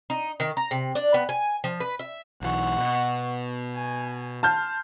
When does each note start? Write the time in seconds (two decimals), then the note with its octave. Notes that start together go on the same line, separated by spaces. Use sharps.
0.10 D#4
0.40 D#3
0.57 A#5
0.71 C3
0.95 D4
1.14 B3
1.29 G#5
1.64 F3
1.80 B4
1.99 E5
2.42 B1 E3 F#5 C#6
2.78 B2
3.74 G#5
4.43 A5 C6 F6 G6